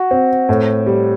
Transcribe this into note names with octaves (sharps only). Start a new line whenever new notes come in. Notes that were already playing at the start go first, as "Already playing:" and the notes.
Already playing: F#4
C4
A2
G3